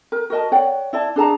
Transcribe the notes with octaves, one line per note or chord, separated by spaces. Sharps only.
A#4
F#4 A#4 D#5 A5
C#5 D5 F#5 G5
E4 D5 A5
D4 G#4 A5 A#5